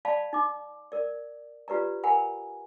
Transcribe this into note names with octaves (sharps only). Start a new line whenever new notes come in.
D5 F5 A5 B5
D#4 D6
A#4 D5
F4 G4 B4 D5 A#5
A#4 F#5 G#5 A#5 B5